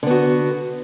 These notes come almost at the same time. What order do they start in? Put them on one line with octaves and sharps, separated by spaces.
D3 B3 F#4